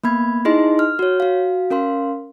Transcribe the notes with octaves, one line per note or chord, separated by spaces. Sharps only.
A#3 B3 B5 G#6
D#4 E4 G#4 D#5 C6
F6
F#4 C#5
F#4 F5
C#4 A#4 F5 C6